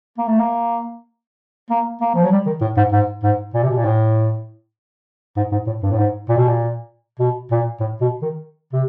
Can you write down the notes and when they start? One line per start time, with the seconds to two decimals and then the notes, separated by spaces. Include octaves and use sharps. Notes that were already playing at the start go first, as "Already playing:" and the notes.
0.18 A#3
0.28 A3
0.40 A#3
1.70 A#3
2.01 A#3
2.15 F3
2.24 F#3
2.32 G3
2.46 D#3
2.61 A2
2.77 G#2
2.92 G#2
3.23 G#2
3.54 A#2
3.63 C3
3.70 B2
3.77 A#2
3.85 A2
5.37 G#2
5.52 G#2
5.67 A2
5.83 G2
5.91 A2
5.98 G#2
6.29 A#2
6.37 B2
6.48 A#2
7.20 B2
7.51 A#2
7.80 A2
8.01 B2
8.22 D#3
8.73 C3